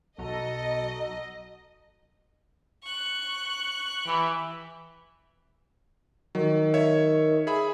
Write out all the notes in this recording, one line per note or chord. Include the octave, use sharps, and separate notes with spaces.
B1 F#4 A4 D#5 A#5
C#6 F#6
E3 G4 E5
D#3 F#3
C#5 E5
G#4 E5 B5